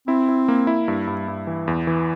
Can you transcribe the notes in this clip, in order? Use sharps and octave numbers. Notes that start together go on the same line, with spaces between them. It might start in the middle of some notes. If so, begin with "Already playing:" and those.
C4 E4
E4
A#3
E4
G2
G2
G2
E3
E2
E3